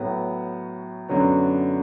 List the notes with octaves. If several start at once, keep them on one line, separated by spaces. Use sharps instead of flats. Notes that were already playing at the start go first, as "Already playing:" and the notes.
Already playing: A2 F#3 B3
F#2 D3 F#3 B3